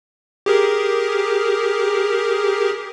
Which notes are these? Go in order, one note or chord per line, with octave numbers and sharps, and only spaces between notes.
G4 G#4 A#4